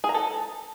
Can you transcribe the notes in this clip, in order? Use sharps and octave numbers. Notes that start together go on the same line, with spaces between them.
G#4
A#5
A4